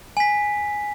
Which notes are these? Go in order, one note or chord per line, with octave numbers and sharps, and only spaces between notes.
G#5 B6